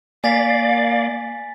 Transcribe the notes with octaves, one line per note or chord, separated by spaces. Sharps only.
A#3 D5 F5 G#5 A6 B6